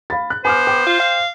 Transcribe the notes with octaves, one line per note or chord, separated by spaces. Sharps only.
F5 B5 A6
F#6
B3 C5 G#5 D6 F6
G5 D6
F4
F5